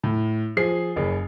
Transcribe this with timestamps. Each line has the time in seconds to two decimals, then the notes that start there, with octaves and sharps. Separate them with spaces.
0.03 A2
0.57 F3 G#4 C7
0.96 F#1 C#3